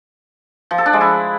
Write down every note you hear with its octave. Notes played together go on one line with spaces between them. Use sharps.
F3
A4
D4
G#3
E4